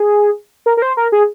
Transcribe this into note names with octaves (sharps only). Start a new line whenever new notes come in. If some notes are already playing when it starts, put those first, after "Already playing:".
Already playing: G#4
A#4
A#4
C5
A#4
G#4